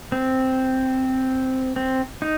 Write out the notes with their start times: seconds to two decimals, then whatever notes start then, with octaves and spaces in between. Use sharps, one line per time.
0.12 C4
1.76 C4
2.22 D#4